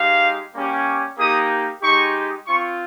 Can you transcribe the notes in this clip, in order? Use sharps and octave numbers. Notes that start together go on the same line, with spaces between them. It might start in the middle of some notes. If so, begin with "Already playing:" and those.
Already playing: G#3 D#4 G4 F5
G3 A#3 C#4 G4
A#3 D#4 G4 D#6
G#3 D#4 G4 C#6
C4 F4 C#6